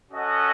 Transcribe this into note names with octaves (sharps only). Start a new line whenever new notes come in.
C#4 F#4 A4 D#5 F#5